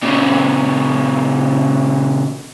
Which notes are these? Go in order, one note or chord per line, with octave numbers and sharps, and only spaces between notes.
A#2 C#3